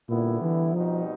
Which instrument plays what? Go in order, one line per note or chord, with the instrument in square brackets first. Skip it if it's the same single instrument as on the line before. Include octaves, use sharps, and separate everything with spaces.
[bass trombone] A#2 [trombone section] D3 G3 B3 E4
[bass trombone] E3
[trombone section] B2 G3 C4 D#4 [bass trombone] F3